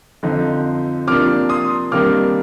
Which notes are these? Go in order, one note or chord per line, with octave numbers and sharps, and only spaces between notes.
F2 D3 F3 C4 D#4
C3 F3 A#3 D4 D6 F6
C6 D#6
C3 D#3 G3 A#3 D4 D6 F6